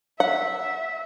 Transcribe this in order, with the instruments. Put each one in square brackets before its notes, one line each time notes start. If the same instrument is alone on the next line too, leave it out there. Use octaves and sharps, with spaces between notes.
[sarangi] E5 [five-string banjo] F#5